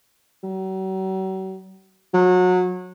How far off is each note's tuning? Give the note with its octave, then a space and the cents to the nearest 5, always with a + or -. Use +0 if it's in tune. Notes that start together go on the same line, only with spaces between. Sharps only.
F#3 +45
F#3 -25